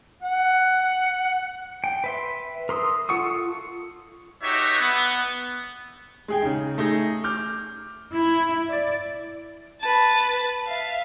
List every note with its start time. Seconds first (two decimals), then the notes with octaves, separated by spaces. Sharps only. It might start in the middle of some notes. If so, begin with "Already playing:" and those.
0.22 F#5
1.84 G5
2.04 B4 E5 C6
2.69 A#4 C6 D#6 E6
3.09 F4 A4 F#5 C#6 D#6
4.42 D#4 F#4 G4 B4 C#5 E5
4.81 B3
6.28 G#3 G#4 G5
6.42 C#3 D#4
6.78 A3 D#4 G#4 A#6
7.24 D6 F6 G6
8.14 E4
8.68 D5
9.80 B4 A5
10.67 E5 F5